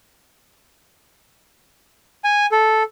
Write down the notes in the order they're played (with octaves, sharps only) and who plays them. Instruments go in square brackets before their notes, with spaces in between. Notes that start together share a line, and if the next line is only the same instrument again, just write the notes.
[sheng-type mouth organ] G#5
A4